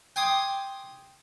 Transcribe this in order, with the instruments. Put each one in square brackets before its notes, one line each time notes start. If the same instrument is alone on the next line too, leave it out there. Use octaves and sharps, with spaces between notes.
[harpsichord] G5 G#5 C6 D6 D#6